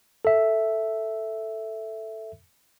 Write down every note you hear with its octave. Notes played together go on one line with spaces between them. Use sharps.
A4 E5